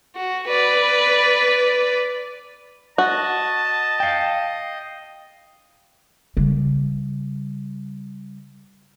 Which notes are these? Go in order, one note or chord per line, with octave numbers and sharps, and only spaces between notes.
F#4
B4 D5
F#4 D#5 A5
F5 G5
C#3 G3